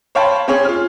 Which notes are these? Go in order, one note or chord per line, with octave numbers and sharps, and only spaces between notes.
C5 C#5 F5 G5 A5 B5
C4 C#4 G#4 C#5
F4 F6